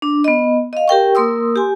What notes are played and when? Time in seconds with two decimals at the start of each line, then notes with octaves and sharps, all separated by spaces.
0.02 D4
0.24 B3 D#5
0.73 D#5 F5
0.88 G4 A#4 G5 C#6
1.15 A#3 A#4 C6 D#6 E6
1.56 G4 G#5